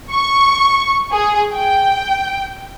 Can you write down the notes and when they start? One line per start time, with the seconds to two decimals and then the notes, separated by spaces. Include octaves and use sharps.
0.10 C#6
1.12 G#4
1.54 G5